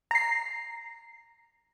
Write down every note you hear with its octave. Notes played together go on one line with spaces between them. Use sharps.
A#5 C7